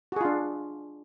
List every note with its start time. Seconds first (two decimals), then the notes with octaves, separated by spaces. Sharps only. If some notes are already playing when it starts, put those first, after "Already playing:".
0.12 F#4
0.16 G#4
0.21 F4
0.25 D4